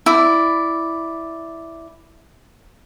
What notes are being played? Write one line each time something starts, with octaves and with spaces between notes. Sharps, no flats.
E4 D5